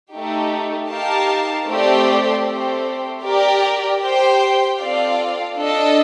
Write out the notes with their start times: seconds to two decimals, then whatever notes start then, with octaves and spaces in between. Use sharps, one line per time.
0.11 A3 D#4 G4
0.89 D#4 G4 A#4 F5 A5
1.67 A3 C4 G4 D5
2.45 A3 C4 G4 C5
3.23 G4 A#4 D5
4.01 G4 C5 G5
4.79 C4 F4 A4 D5 F5
5.57 D4 A4 D#5